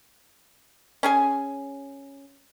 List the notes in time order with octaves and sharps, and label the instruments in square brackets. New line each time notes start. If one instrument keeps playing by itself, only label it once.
[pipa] C#4 G#4 G#5